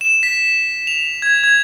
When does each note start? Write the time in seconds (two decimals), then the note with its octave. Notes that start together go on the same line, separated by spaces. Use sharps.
0.01 E7
0.23 B6
0.87 F7
1.22 G#6
1.44 G#6